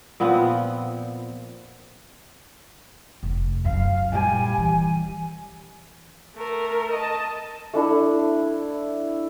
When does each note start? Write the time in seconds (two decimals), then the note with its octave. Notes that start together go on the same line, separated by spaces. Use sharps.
0.20 A#2 F3 B3 C4
3.23 F1
3.65 F#2 F5
4.12 A#2 G3 G#5
4.58 E3
6.36 A3 A#4
6.92 D#5 A5
7.74 A3 D4 E4